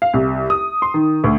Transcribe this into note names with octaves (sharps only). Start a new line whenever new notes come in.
F5
C2
D#6
C6
D#3
D2